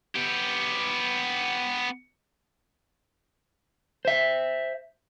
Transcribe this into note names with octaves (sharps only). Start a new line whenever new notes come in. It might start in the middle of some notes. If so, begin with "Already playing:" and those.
B3 G4
C5 E5